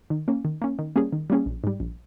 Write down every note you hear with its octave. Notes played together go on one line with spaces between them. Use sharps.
D#3
A#3 C#4
D#3
A#3 C#4
D#3
G3 A#3 C#4 G#4
D#3
G3 A#3 C#4 G#4
A#1
G#2 G3
A#1